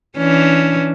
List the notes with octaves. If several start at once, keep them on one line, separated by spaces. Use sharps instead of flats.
E3 C#4 D4